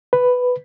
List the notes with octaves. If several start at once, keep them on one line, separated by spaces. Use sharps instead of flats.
B4